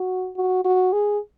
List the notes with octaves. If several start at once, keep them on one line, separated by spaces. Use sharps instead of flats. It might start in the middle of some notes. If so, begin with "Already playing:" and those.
Already playing: F#4
F#4
F#4
G#4